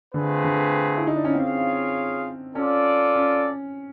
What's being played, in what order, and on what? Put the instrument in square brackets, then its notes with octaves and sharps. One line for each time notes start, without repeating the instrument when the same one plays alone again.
[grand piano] D3 [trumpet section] A3 C4 F4 G#4 B4
[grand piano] D3
E4
D#4
D4
C#4
[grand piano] C4 [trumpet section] F4 G#4 C#5 F5
[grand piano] C#4 [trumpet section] F4 A4 D5
[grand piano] C#4